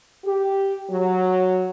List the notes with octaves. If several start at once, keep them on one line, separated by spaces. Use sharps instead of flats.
G4
F#3